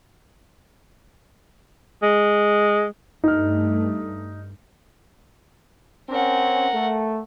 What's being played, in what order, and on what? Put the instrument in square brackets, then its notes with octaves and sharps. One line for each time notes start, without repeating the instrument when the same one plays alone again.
[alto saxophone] G#3
[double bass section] G2 A3 [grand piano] D#4 F6
[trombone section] C4 C#4 [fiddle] A#4 F#5
[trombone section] A3